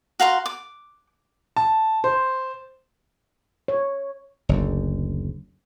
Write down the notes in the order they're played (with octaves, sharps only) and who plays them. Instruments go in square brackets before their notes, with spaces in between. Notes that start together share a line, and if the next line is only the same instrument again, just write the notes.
[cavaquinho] F#4 F5 A#5 C6
D6
[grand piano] A5
C5
[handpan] C#5
[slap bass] F#1 D2